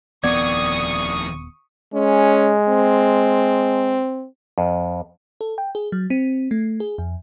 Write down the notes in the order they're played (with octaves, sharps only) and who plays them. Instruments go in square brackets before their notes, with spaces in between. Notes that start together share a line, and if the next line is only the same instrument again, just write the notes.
[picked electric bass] D#1 B3 [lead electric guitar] F2 D#3 [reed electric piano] D5 G#6 [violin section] C#6 D#6
[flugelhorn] G#3 [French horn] C#4
[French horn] C4
[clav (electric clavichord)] F2
[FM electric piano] A4
G5
G#4
F#3
C4
A3
G#4
F2